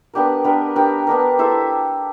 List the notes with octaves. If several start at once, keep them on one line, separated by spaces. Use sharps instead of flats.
B3 D4 G4 A#4
B3 D4 G4 A#4
B3 D4 G4 A#4
B3 D4 G4 A#4
E4 A4 C5 E5